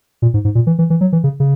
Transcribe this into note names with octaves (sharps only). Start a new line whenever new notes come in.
A#2
G#2
G#2
A#2
E3
E3
E3
F#3
E3
C#3
C#3